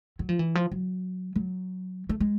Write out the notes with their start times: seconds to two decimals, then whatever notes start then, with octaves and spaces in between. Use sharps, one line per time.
0.19 F#3
0.29 F3
0.39 E3
0.55 F3
0.72 F#3
1.36 F#3
2.09 A3
2.20 G#3